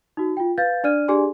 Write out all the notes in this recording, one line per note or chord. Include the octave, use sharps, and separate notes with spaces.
D#4 F#4
F4 G5
B4 F5 G6 A6
D4 D5 F6 D#7
D4 G4 G#4 D5 G#5 C6